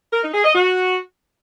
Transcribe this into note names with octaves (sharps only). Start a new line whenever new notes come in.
A#4
D#4
G#4
D#5
F#4